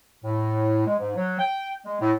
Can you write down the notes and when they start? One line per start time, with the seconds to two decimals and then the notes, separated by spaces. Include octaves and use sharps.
0.24 A2
0.86 G#3
0.99 G#2
1.16 F#3
1.39 G5
1.85 G#3
2.01 A2